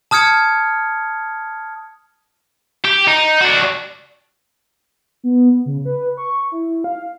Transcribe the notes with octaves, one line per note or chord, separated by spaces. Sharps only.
A5 D#6 F6 G#6 C#7
G4
D#4
D4 F#4
B3
C#3
B4
C#6
E4
F5